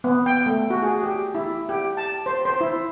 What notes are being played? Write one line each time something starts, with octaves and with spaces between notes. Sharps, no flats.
B3
G5
A3
F#4
G#4
G4
E4
G4
A5
C5
C5
E4